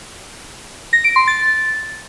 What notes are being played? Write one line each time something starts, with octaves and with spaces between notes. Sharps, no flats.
A#6
D7
C6
A6